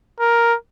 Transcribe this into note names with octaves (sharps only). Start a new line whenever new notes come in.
A#4